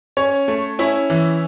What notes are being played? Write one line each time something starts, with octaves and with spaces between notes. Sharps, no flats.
C#4 C#5
A3
C#4 E4 E5
E3